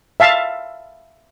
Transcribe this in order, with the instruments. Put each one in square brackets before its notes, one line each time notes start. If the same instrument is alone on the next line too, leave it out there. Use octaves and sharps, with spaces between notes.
[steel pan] E5 F5 A5